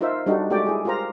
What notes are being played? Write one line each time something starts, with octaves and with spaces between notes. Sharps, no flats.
D#4 F4 A#4 C5 E5
G3 D4 D#4 F#4 G4 A4
G#3 A3 F#4 G4 D5 G5
E4 G#4
F4 G4 A#4 C5 A#5